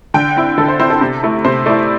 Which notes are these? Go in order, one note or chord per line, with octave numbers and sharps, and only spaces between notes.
D3 G5
C4 E4
D3 A4
C5
C4 E4 C5
A4
C3
A3 E4
C3 C5
A3 E4 D5